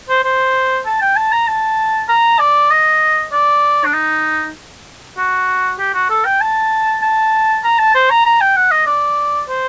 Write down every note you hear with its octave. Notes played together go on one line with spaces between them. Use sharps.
C5
C5
A5
G5
A5
A#5
A5
A#5
D5
D#5
D5
D4
D#4
F#4
G4
F#4
A4
G5
A5
A5
A#5
A5
C5
A#5
A#5
G5
F#5
D#5
D5
C5